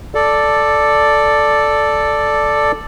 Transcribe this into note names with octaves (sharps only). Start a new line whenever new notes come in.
A4 D5